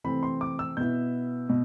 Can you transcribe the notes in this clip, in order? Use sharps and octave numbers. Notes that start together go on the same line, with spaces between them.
C3 E3 A3 C4 B5
C6
D6
E6
B2 B3 E4 G6
B2